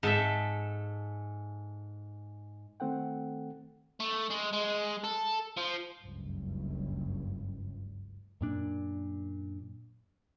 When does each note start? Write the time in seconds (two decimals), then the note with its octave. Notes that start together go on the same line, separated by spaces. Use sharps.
0.03 G#2 A4 E5
2.80 D#3 A3 C4 A4 F#5 G5
4.00 A3
4.30 G#3
4.53 G#3
5.04 A4
5.57 F3
6.01 F#1 C#2 G2
8.41 F#2 A#2 D4